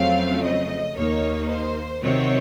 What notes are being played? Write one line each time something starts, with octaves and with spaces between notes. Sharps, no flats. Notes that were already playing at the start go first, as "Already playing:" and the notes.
Already playing: F2 C#3 F#3 A3 C4 F5
D#5
D#2 D#3 A#3 D#4 C#5
C5
C3 D#3 F#3 C4 C#5